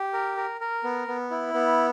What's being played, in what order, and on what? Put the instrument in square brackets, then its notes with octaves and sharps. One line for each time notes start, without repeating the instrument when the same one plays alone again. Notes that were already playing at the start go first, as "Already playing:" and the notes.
Already playing: [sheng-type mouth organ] G4
A#4
A#4
A#4
B3
B3
E4
B3